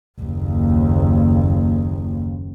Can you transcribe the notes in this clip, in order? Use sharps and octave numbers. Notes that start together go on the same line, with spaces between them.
F#1 D#2